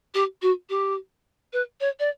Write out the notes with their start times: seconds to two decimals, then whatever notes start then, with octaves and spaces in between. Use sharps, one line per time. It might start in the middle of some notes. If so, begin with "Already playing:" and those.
0.14 G4
0.42 F#4
0.69 G4
1.53 B4
1.80 C#5
1.99 D5